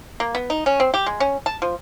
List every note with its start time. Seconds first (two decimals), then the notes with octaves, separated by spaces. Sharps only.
0.20 A#3
0.35 B3
0.50 D#4
0.66 C#4
0.80 C4
0.94 G4
1.06 G#3
1.20 C#4
1.46 A5
1.62 F3